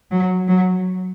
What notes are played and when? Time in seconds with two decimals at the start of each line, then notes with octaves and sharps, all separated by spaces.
0.11 F#3
0.48 F#3